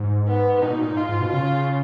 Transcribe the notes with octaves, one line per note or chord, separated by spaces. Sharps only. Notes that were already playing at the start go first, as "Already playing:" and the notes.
Already playing: G#2
B3
A#2 D#4
B2
A#2
G#2
F4
G#2
B2
C#3 F4